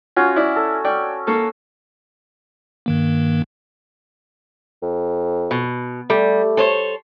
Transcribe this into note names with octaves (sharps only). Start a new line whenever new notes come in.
C#4 F4 F#4
E4 D5
A4
D5 G5 C#6
A#3 A4 C#6
G2 D#3 A#3
F2
B2
G3 A3
A4 C5 C#5